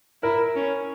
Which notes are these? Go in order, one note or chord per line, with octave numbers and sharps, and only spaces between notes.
E4 A#4
C#4